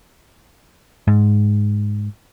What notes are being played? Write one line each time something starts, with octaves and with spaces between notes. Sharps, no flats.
G#2